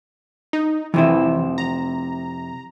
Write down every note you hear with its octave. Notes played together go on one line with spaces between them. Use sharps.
D#4
F2 C3 E3 E4
A#5